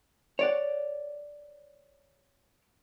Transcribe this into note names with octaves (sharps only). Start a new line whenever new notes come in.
C#5 D5 F#5